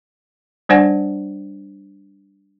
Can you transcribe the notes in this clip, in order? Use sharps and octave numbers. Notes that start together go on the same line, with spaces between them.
G3 D4 C5 D5 F#5 G#5